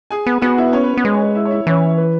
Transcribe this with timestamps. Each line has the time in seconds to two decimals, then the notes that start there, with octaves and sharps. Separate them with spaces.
0.11 G#4 G#5
0.26 B3
0.42 B3 F#4 F#5
0.58 E4 E5
0.73 C#4 C#5
0.83 B4
0.94 B4
0.97 B3
1.04 G#3 B4
1.13 C#5
1.22 B4
1.35 E4 E5
1.45 C#5
1.51 E4 E5
1.67 E3 C#4 C#5
1.97 B4